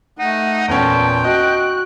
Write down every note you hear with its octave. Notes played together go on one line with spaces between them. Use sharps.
A3 D#4 F#5
E2 A#2 B3 C#4 A4 G5 A5
F#4 D#5 F#6